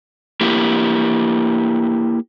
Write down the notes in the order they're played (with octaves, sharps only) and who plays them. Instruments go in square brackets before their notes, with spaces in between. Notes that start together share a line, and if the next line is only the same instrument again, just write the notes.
[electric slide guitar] A#3 E4 G4